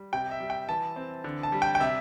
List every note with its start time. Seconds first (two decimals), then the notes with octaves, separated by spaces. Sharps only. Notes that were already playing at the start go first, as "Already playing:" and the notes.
Already playing: G3
0.13 C3 G5
0.31 E5
0.40 G3
0.50 G5
0.69 E3 A5
0.96 C4
1.24 D3
1.43 A5
1.52 G3
1.62 G5
1.75 G5
1.80 C3 E5